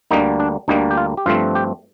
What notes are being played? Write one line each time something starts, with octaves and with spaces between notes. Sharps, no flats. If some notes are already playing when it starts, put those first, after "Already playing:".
D2 D3 G3 A#3 D#4
D4
D2 D3 G3 A#3 D#4
G4
F4
G4
G2 F3 A3 C4 F4
G4